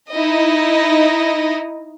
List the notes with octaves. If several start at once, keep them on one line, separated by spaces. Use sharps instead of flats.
D#4 E4 D#5